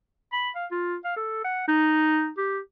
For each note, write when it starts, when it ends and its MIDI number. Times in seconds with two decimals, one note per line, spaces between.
0.33 0.50 83
0.55 0.66 77
0.71 0.95 65
1.04 1.16 77
1.16 1.42 69
1.45 1.64 78
1.68 2.29 63
2.38 2.59 67